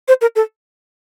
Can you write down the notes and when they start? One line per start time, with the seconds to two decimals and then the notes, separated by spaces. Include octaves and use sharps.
0.08 C5
0.21 A#4
0.36 A4